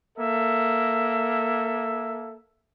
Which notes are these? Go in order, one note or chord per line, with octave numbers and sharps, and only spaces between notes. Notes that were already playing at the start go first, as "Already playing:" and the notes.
A#3 A4 E5